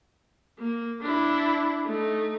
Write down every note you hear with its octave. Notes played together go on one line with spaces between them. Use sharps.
A#3
D4 E4
A3 D#4